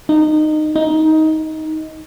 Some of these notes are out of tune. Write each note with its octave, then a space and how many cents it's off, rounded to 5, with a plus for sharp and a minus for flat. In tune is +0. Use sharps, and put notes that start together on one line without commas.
D#4 -20
D#4 +15